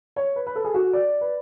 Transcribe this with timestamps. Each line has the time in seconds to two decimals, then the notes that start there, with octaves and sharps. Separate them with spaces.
0.16 C#5
0.36 B4
0.46 B4
0.56 A4
0.64 G#4
0.74 F#4
0.93 D5
1.21 B4